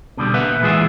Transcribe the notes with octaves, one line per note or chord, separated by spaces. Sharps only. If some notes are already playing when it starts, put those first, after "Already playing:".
B2 D3 G3
A#2 B4 E5 F#5
A#2 E3 G#3 F4 G#4 E5